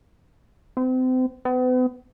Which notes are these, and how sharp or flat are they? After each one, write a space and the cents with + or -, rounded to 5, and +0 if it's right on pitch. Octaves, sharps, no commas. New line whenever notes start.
C4 -35
B3 +40